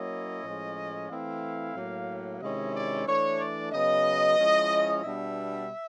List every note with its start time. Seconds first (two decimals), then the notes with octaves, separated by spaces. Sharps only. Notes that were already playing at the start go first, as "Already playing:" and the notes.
Already playing: F#3 A#3 C#4 E4 D#5
0.44 A2 F3 G#3 C#4
1.10 E3 A3 C4 E4 F5
1.75 A2 F#3 A#3
2.41 C3 D#3 G#3 C#4 E4 D#5
2.74 D5
3.07 E3 A3 D4 C#5
3.39 D5
3.72 C#3 F#3 B3 D#5
4.38 F3 G#3 C#4 E4
5.03 B2 G3 B3 D4 E5